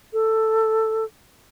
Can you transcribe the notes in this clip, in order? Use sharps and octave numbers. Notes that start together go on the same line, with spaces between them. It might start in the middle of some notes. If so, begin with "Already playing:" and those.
A4